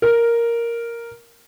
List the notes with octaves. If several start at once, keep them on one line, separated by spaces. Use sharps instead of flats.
A#4